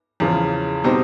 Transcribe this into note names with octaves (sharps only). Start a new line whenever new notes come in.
E2 C#3 F3
B2 G3 C4 D#4